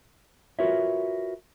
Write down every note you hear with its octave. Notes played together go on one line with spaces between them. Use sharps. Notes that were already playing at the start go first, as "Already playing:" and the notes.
F4 F#4 A#4 B4 C#5 E5